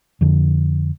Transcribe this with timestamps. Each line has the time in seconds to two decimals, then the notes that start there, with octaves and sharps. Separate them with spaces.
0.21 F2 D3